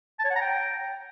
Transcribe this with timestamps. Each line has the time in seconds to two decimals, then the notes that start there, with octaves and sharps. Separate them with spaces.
0.19 A5
0.25 C#5
0.30 F#5
0.36 A#5
0.41 G5